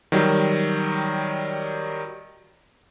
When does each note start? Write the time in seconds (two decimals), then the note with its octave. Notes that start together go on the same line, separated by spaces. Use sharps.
0.12 D#3 F#3 G3